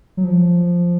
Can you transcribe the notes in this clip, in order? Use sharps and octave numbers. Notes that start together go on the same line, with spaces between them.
F#3
F3